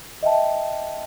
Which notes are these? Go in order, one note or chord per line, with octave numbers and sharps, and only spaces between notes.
D#5 E5 G5 A5